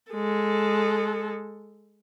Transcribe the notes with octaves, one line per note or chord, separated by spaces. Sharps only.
G#3 A4